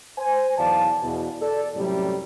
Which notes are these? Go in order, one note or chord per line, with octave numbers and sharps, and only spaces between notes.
C5 G#5
B1 E2 F#3 D5 F5 A5
E2 B2
A4 D5
F#2 A2 C3 G3